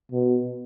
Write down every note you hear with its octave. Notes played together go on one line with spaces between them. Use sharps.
B2